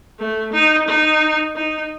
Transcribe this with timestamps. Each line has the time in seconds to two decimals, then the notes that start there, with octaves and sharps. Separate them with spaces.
0.19 A3
0.53 D#4
0.88 D#4
1.56 D#4